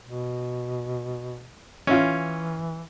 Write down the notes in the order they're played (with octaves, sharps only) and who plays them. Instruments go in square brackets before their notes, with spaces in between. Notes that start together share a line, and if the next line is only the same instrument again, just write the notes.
[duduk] B2
[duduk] E3 [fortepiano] C#4 E4 F4